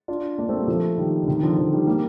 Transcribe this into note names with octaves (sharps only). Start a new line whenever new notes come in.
D4 F4
A#3 D4
A3 C4
G3 A#3
F3 A3
D#3 G3
D3
C3 D#3
D3 F3
D3 F3
D#3 G3
G3 A#3